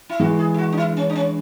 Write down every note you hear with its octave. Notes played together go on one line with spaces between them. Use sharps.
E4
E3 G#3 F#4
G#4
E4
F#4
D4
E4
C#4
D4
C#4